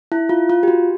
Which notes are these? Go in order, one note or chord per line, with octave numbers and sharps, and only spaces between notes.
E4
F4
F4
G4
F#4